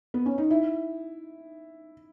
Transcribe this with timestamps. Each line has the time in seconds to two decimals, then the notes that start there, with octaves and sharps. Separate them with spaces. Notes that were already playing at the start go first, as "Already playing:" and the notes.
0.14 B3
0.26 C#4
0.38 D#4
0.51 E4